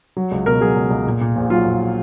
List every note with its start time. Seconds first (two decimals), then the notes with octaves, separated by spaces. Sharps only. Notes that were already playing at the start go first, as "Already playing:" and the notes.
0.17 F#3
0.32 C#2
0.46 B2 A#4
0.61 F#3 G#4
0.76 C#2
0.91 C#2
1.07 A#2
1.21 A#2
1.36 A#1
1.50 F#3 F4
1.66 A#1